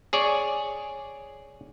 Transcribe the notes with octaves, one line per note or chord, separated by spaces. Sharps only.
G#4 C#5 D5